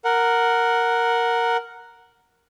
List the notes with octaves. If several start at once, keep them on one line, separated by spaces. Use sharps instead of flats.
A#4 F#5